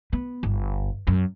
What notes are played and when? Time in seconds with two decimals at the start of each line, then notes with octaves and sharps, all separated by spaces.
0.13 B3
0.43 G1
1.07 F#2